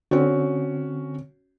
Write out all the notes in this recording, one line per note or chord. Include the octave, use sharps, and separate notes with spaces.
D3 C4 C#4 F#4